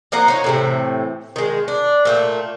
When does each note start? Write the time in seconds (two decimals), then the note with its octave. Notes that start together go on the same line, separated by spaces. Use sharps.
0.12 F3 A#3 F#5 A#5
0.28 D#4 C#5
0.44 A2 C3 E3
1.36 D#3 G#3
1.68 D4
2.05 A#2 A3 G5